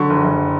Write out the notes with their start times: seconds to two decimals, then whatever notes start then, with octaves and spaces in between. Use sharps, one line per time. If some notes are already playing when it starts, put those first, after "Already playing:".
Already playing: D3 F#3 C#6
0.10 F#1
0.24 F#1